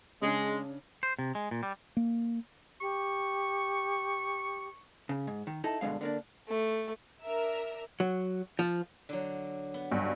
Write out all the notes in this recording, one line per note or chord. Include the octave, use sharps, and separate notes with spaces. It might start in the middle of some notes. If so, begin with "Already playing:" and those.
C#3 G#3 D4
C5
C3
G#3
A#2
G3
A#3
G4 C#6
C#3
G#2
D#3
D#4 E4 A4
G2 B2 D3 G#3 F5
D3 A#3 D4
A3
D4 A#4 E5
F#3
F3
D3 F#3
B3
B1 G2